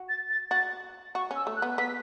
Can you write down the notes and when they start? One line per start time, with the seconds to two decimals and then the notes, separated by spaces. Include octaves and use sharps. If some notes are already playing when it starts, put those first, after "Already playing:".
Already playing: F#4
0.09 A6
0.30 A6
0.51 F#4 A6
1.15 F#4 C#6
1.31 C#4 E6
1.47 A3
1.56 F#6
1.62 B3
1.78 B3 B6